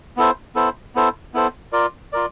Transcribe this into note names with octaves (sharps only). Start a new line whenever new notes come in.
B3 E4 A4 C5
B3 E4 A4 C5
B3 E4 A4 C5
B3 E4 A4 C5
F4 A#4 D5
F4 A#4 D5